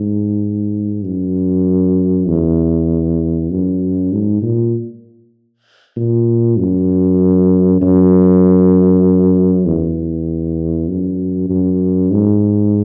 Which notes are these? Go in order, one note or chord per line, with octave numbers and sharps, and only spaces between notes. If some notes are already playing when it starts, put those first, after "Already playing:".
Already playing: G#2
F#2
E2
F#2
G#2
A#2
A#2
F#2
F#2
E2
F#2
F#2
G#2